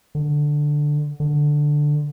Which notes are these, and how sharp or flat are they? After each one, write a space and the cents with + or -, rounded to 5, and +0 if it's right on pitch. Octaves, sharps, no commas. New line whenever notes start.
D3 +5
D3 +5